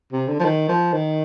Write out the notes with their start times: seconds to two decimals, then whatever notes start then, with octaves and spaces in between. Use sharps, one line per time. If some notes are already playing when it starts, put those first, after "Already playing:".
0.12 C3
0.28 D3
0.40 F3
0.45 D#3
0.68 F3
0.93 D#3